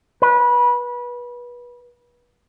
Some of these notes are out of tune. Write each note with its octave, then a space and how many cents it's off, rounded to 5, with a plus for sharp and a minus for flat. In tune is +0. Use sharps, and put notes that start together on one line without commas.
B4 -25